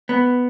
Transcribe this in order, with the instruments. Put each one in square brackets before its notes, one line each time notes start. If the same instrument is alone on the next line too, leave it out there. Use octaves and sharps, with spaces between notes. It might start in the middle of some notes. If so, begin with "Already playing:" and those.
[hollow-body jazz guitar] B3